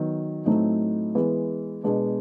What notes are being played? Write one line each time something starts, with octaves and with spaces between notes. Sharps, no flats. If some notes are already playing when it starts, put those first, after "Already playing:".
Already playing: D#3 F#3 B3
A2 F#3 A3 C4 D#4
E3 G#3 B3
B2 G#3 B3 D4